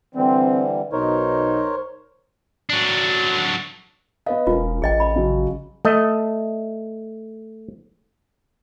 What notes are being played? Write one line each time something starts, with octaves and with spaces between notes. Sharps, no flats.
D3 E3 G3 C4
B1 B2 D#4 A#4 C5 C#5
F#3 D4
B3 B4 D#5 F5
E1 C#4 F4 A#4
A1 G#4 D#5 G5
D#5 B5
C#3 F#3
A3 D#5